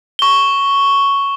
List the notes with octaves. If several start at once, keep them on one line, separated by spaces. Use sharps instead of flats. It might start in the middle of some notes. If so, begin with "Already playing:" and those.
C#6 G7